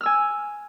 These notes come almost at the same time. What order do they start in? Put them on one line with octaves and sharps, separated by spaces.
F6 E6 G#5